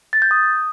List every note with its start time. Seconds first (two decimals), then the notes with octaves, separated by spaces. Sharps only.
0.13 A6
0.22 G6
0.31 D#6